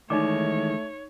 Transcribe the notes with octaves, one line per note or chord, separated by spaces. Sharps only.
D#3 E3 G#3 A3 D#4 C#5 D5 D6